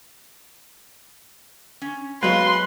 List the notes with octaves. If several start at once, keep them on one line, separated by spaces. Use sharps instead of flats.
C#4
F#3 G#3 B3 F#4 B4 F5 C6